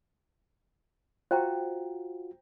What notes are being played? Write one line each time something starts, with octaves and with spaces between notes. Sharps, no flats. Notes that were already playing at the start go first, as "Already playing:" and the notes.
F4 F#4 C5 G5 A#5